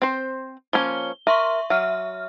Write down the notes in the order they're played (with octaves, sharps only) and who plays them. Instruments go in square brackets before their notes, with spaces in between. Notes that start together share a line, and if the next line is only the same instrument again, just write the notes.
[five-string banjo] C4 C5
[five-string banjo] F3 A#3 C#4 [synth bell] G7
[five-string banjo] A#4 [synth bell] E5 C6 C#6
[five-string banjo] F#3 [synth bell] E5 F6